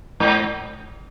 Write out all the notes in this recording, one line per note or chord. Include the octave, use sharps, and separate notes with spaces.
G#2